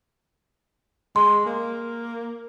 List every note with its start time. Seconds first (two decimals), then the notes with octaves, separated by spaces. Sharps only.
1.16 G#3 C6
1.46 A#3